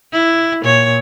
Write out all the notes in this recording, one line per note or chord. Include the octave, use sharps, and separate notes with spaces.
E4
A#2 C#5